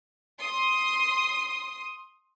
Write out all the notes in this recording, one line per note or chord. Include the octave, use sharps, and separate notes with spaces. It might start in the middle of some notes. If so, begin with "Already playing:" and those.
C6 D#6